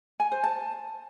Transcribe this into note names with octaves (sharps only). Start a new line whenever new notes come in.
G#5
C5
A5